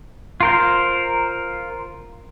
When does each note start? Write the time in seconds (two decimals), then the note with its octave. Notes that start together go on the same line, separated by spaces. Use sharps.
0.41 F4 A#4 C5